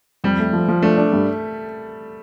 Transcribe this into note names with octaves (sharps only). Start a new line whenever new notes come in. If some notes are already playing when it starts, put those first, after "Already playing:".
F2 G3
A3
F3
F3
A3 D4
D4
G2